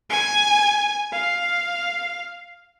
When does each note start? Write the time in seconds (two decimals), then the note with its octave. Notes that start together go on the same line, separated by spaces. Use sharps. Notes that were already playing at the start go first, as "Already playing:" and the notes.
0.10 G#5
1.12 F5